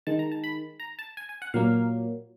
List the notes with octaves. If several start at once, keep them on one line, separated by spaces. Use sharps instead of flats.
D#3 G#3 A5
A#5
A5
B5
A#5
A5
G#5
G#5
F#5
A#2 F#3 A#3 F5